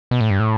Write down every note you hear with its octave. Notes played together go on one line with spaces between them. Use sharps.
B2
A2
G2
A2